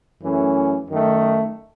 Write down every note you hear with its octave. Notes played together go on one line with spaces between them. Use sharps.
F#2 E3 A3 C#4
F#2 D#3 A3